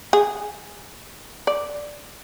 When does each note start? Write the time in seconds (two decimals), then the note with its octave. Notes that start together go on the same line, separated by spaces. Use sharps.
0.13 G#4
1.47 D5